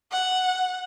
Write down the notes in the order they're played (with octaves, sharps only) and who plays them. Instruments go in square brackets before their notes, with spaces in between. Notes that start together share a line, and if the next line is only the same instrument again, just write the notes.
[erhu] F#5